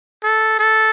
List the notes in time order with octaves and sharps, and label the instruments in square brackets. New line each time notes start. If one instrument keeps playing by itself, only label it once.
[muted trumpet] A4
A4